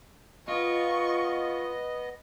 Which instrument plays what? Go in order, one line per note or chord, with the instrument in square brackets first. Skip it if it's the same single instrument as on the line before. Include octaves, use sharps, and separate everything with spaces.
[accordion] B3 D#5 [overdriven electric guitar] F4 [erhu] C#6